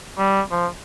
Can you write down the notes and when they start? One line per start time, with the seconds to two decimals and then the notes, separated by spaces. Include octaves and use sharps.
0.18 G3
0.51 F3